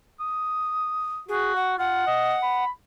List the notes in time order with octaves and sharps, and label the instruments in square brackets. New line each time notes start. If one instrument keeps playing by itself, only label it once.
[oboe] D#6
[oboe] F#4 [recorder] G#4
[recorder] F#5
[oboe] F4 [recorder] F#5
[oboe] D#5
B5